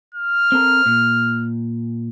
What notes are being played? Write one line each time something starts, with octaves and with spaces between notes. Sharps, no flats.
F6
C4 A4 A#4
A#2